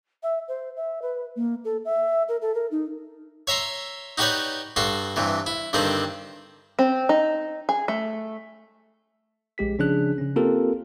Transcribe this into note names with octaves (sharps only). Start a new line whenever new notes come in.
E5
C5
E5
B4
A#3
A4
E5
A#4
A4
A#4
D#4
C#5 E5 A#5 C6
D#4 F#4 G4 B4 C#5 D5
G2 F#4 A4 C6
G2 C3 E3
E4
G2 D3 D#3 C4 D4
C4
D#4
G#4
A3
A#1 G#3 G4 B6
C#3 F3 C#4 D4 G#4 F#6
C#3 C#4
A#3 C4 F4 G4 A4 A#4